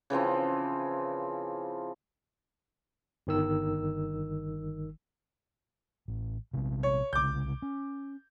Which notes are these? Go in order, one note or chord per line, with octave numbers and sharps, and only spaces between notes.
C#3 E3 F3 C4
G1 D#3 E6
A1
A#1 C3
C#5
C2 C#3 D6 G6
C#4